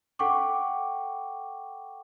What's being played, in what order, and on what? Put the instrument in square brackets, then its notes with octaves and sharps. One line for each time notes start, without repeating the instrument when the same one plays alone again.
[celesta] A4 F#5 G5 C#6 D6